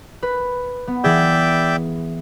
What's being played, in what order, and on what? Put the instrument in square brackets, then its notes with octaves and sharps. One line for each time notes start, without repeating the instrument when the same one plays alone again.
[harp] B4
B3
[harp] E3 G#4 [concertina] D5 E5 G5